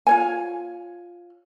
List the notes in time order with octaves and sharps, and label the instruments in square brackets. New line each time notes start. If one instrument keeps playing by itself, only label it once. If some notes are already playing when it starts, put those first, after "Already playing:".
[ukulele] F4 C#5 G#5